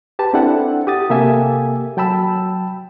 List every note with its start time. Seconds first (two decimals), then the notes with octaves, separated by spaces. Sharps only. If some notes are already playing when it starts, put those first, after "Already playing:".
0.19 G4 B4 A5
0.33 C4 D4 E4 A4 F#5 G5
0.87 G4 D#6 A6
1.10 C3 A#3 G4 A4 E5 G#5
1.97 F#3 G5 A5 B5 E6